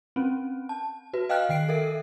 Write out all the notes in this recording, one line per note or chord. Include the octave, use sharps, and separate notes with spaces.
C4 C#4
A5
F#4 B4
D#5 F5 G5 F6 F#6
D#3 G5 C7 D7
A4 A#4 E5